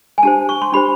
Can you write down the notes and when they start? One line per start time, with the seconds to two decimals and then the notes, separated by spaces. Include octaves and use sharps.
0.18 G#5
0.23 D4 G4 C5 A5
0.49 C#6
0.62 C6
0.73 D4 G4 C5 B5